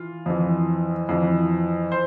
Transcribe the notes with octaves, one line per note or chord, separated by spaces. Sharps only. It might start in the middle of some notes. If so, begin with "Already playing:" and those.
Already playing: E3 F4
F2 E3
F2 E3
C5